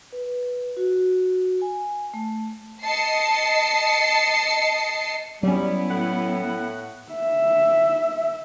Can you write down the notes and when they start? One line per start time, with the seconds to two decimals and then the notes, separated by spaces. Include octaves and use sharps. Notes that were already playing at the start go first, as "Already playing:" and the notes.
0.12 B4
0.77 F#4
1.62 G#5
2.14 A3
2.84 D#5 A5 C7 C#7
5.43 F#3 G3 B3 C#4 E4
5.89 A2 F#5
7.12 E5